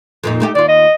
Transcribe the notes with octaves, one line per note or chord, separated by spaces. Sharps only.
F2 A#2 D#4
A3 D#4 G4
D#2 F4 D5
D#5